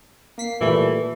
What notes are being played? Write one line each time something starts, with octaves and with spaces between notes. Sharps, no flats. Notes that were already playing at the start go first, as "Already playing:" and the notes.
A#3 B6 C7
A#2 E3 G3 A3